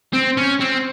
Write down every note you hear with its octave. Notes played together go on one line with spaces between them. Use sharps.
C4
C#4
C4